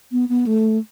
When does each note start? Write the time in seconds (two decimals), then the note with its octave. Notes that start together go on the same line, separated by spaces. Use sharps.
0.12 B3
0.29 B3
0.47 A3